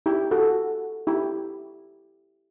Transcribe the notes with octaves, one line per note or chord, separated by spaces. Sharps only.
E4 G4
F#4 A4
E4 G4